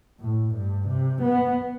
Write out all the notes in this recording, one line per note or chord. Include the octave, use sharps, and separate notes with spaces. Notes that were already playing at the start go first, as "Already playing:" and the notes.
A2
G2
C3
B3